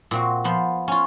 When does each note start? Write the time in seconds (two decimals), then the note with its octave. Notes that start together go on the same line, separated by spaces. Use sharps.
0.11 A#2 C4 F#4
0.44 F3 B3 C5
0.88 C#4 F4